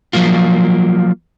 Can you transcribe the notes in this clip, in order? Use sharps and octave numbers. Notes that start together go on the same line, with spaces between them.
F3 F#3 A#3 F4